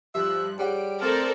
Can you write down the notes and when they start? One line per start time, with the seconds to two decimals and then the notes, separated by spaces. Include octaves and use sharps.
0.15 G2 F3 G4 E5 F#6
0.59 G3 G#4 C#5 F#5 D7
1.01 A3 C4 A4 A#4 C5 D5 F6